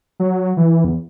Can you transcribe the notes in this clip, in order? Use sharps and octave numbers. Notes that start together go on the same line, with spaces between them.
F#3
E3
E2